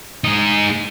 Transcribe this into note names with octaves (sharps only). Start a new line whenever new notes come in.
G#3 D#4